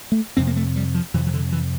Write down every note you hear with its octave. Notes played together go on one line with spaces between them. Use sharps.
A3
F2 C3 C4
A#3
A3
G3
F3
F2 C3 E3
E3
D3
E3